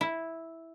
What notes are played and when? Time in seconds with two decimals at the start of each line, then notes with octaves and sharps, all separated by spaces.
0.01 E4